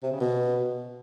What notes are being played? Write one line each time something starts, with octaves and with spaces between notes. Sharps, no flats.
C3
C#3
B2